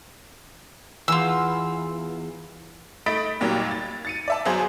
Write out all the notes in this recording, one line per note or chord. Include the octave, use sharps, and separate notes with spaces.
E2 F4 E6
A3 D#5 B5 A6 B6 D7
D#2 A#2 F#3 G3
A6
A6 C#7 D#7
D5 E5 A5
G1 F#3 G#4 C5